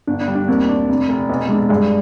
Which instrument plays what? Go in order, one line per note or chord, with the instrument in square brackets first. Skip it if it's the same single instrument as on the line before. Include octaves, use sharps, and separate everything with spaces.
[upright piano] G1 [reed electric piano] D4
[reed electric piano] D4
[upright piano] G3
[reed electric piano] D4
[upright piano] D#2 [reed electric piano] C4
[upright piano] D4
F1
F1
[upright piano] B1 [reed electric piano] B3
[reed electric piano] G#3 [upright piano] D4
[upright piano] G2 [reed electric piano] G#3